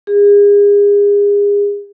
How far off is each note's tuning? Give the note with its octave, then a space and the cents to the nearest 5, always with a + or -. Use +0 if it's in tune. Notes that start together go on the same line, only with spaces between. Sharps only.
G#4 -35